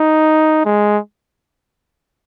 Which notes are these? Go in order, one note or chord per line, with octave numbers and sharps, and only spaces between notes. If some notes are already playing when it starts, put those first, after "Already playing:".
Already playing: D#4
G#3